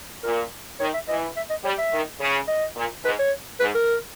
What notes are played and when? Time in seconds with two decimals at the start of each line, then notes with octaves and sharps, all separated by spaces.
0.24 A#2 A#4
0.80 D#3 C#5
0.94 E5
1.08 E3 D#5
1.37 E5
1.50 D#5
1.64 G3 C#5
1.78 E5
1.93 D#3
2.20 C#3
2.48 D#5
2.76 A#2
3.04 G#2 B4
3.19 C#5
3.60 G#2 B4
3.75 A#4